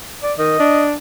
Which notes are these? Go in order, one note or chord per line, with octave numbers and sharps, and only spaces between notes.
D5
D#3 D#5
D4